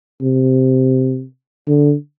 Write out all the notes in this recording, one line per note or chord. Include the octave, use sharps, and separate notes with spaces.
C3
D3